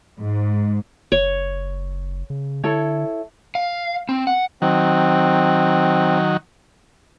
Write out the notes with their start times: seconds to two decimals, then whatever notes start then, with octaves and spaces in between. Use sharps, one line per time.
0.19 G#2
1.12 F#1 C#5
2.30 C#3
2.64 D3 E4 A4 C#5
3.55 F5
4.09 C4
4.27 F#5
4.62 D#3 F#3 C4